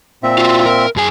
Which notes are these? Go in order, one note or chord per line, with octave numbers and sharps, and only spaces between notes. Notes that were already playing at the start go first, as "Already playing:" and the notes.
A#2 C4 E5
F4 F#4
A#4
F#2 G#4 G#5